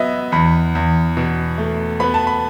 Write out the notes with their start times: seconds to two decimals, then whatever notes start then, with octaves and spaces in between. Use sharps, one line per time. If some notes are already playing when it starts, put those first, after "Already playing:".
Already playing: F#3 B3 D#5 E5
0.32 E2 B5
0.75 E2
1.17 B2
1.58 A3
2.00 B3 B5
2.14 A5
2.27 B5